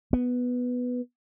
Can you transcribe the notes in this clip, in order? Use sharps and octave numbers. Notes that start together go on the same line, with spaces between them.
B3